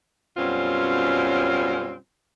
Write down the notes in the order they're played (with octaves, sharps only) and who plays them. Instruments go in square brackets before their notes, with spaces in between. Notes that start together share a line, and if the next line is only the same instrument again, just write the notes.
[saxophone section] F#2 B2 G3 C4 C#4 F4